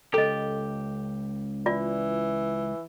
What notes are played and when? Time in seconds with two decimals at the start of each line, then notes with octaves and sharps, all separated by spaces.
0.14 C#2 G4 A4 D#5
1.66 E3 F4 D5